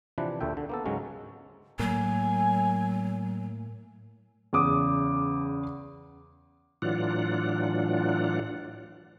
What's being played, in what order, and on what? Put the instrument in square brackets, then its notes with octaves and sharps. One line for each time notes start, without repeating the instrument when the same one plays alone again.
[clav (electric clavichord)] C3 E3 F3 D4 B4
D2 A#2 A3 E5 G5
D3
A#3 B3 A4
G#2 C#3 F#3 G#3 C#4
[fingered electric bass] A2 A#3 [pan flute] F#3 [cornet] G#5
[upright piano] E2 C#3 D6 D#6
[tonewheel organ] A2 E3 F#3 D4 F4 F#5